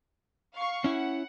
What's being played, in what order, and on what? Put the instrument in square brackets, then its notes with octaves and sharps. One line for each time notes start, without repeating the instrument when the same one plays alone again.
[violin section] F5 C#6 C7
[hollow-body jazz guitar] C#4 E4 [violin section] F#5